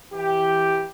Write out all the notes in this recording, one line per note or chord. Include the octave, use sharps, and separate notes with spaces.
E3 G4